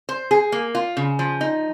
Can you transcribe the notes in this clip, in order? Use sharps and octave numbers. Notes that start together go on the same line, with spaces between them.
C5
G#4
A#3
F4
C#3
F3
D#4